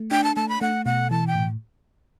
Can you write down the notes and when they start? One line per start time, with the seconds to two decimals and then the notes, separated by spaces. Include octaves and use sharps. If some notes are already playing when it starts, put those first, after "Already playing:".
Already playing: A3
0.11 D4 G5
0.24 A5
0.36 A3 A5
0.49 B5
0.61 A3 F#5
0.85 B2 F#5
1.11 E3 A5
1.27 G5
1.35 A2